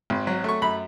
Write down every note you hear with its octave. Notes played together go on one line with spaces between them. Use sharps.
G#1
F#3
A3 C#6
F#2 B5